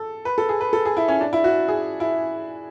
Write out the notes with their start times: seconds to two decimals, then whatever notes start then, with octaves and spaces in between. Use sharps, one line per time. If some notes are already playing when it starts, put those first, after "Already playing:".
Already playing: A4
0.25 B4
0.38 A4
0.49 G#4
0.61 B4
0.73 A4
0.85 G#4
0.97 E4
1.08 C#4
1.21 D4
1.33 E4
1.44 F#4
1.68 G#4
2.00 E4